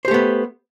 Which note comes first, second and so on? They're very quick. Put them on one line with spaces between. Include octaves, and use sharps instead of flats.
C5 G4 A3 B3